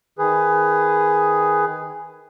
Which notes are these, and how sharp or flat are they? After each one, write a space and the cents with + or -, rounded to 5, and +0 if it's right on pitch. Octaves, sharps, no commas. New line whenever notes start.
D#3 +15 G#4 +0 B4 +20